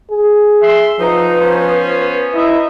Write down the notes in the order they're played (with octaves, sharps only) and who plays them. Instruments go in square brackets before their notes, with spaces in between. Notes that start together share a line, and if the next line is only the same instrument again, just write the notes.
[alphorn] G#4
[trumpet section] E5 C6
[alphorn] F3 [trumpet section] D#4 [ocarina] B4
[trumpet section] B3 C#4 C5
[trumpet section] D#4 D#5 E5 [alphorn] E4